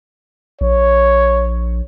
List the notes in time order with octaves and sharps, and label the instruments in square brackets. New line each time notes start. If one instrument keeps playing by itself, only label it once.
[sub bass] A#1 [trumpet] C#5